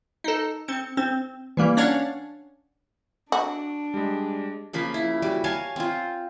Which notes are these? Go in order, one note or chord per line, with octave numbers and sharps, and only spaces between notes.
D#4 A4
C4 C#7
C4
E3 G3 A#3
C#4 D4 C#5 D5 F5 F#5
D4 F#4
G3 G#3
C#3 F3 A#3 B5
E4
G3 F#4
C#5 F5 G#5 A5
C4 F4